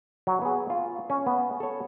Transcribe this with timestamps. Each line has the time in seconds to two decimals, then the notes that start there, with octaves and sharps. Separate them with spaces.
0.27 F#3
0.42 B3 G#4
0.70 F4
1.10 C#4
1.26 B3
1.60 A4 C#5